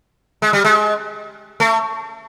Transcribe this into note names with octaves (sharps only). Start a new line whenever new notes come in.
G#3
G3
G#3
A3